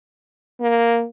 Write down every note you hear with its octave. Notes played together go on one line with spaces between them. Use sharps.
A#3